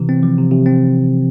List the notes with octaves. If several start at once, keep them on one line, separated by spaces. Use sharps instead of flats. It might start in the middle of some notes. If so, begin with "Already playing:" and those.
Already playing: C3 E3
C4
F3
C3
C3
C4